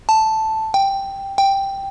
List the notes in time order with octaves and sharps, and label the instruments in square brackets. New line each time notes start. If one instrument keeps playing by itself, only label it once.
[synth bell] A5
G5
G5